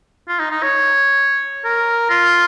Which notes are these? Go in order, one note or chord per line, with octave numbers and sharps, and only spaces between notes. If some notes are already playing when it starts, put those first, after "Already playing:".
F4
D#4
D#4
C#5
A#4
F4